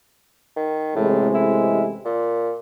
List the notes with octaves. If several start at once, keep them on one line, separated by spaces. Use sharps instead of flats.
D#3
A1 A2 C3 G#3
E4
A#2